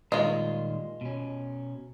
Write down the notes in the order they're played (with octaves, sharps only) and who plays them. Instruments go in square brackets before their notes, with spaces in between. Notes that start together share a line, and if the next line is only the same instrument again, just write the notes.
[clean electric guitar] A#2 D#3 G3 [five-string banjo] G#3 F4
[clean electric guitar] B2 C#4